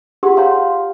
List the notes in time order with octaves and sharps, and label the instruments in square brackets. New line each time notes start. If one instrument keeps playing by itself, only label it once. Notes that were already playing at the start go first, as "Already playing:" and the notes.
[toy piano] F4 G4 [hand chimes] G#4 F#5 C6
[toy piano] C#5 A#5 C6 [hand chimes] F5 G5